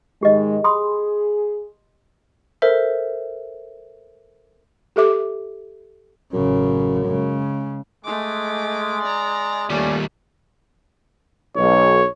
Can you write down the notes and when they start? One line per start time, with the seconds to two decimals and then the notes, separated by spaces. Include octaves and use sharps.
0.23 G#2 D#3 G#3 G4 D#5
0.64 G#4 B5 C6 D#6
2.62 A4 A#4 C5 E5
4.96 G4 A4 E5 D6
6.33 A1 F#2 C#3
7.07 C#3 G#3
8.04 G#3 A3 D6
9.03 D5 A#5
9.70 D#2 G3 A3 A#3 C#4 D5
11.56 B1 C#5